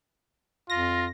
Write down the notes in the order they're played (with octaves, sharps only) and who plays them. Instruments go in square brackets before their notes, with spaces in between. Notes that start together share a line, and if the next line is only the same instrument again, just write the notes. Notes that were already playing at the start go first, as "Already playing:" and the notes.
[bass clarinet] F2 [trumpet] F4 [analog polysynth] A#6